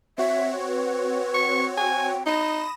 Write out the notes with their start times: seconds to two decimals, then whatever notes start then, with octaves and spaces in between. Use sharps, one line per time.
0.18 C4 F#4 C#5 E5
0.67 B4
1.34 C#6
1.77 G5 G#5
2.26 D#4 B5 D#6 A#6 E7